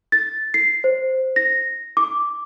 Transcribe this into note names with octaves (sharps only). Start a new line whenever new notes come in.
A6
C7
C5
A#6
D6